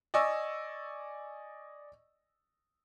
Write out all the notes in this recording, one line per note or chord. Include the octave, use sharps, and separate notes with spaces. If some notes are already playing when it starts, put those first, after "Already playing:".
D5 D#5 G#5 C#6 E6